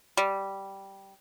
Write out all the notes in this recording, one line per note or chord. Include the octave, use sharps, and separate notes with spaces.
G3